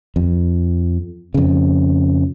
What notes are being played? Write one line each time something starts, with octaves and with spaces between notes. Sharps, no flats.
F2
F2 C#3